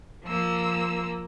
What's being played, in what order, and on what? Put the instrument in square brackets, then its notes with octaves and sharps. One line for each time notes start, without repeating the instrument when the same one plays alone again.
[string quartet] F3 A#3 E6